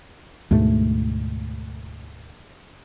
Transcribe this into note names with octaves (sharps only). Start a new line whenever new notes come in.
D2 G#2 B2 A3